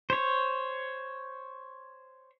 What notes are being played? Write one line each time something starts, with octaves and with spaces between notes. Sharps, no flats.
C5 C#5